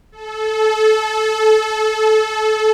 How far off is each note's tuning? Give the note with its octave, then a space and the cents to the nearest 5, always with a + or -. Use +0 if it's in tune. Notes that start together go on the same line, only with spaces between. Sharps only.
A4 -25